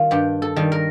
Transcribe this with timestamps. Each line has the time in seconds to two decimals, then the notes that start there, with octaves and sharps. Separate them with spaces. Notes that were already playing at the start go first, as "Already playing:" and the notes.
Already playing: D#3 G3 F4
0.11 G2 G4
0.42 A4
0.56 D#3 G3
0.72 A#4